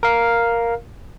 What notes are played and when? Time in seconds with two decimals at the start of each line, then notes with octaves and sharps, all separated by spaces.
0.03 A#4 F5